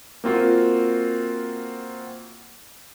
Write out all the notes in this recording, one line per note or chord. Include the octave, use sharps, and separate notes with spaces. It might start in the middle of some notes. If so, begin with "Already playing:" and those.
A#3 C4 F4 F#4